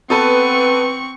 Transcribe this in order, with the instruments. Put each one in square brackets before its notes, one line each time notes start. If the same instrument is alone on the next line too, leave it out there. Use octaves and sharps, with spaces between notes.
[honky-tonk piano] B3 A4 B4 [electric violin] C4 C#6